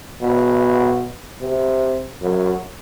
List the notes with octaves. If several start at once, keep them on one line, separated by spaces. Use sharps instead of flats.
B2
C3
F#2